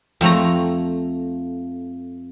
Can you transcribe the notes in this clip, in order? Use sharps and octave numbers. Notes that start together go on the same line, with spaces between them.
F2 A3 C#5 A#5